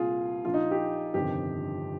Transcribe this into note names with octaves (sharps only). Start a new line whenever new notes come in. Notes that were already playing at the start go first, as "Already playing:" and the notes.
Already playing: C2 A#2 F4 G#4
A#1 A#2 F4
D#4
G4
G1 F2 C3 D#3 G4